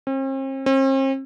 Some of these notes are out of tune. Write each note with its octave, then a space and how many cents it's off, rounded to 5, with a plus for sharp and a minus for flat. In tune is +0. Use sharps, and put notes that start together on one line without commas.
C4 +45
C4 +45